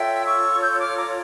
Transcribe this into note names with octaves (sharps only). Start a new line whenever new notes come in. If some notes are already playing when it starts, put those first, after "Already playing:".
Already playing: F4 A4 C#5 E5 G5
C#6 E6
E6 G6
D6 F6
A#5 D6